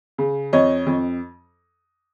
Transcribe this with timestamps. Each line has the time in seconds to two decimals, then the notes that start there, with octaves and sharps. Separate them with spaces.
0.18 C#3
0.53 F2 C#5 D#5
0.87 F2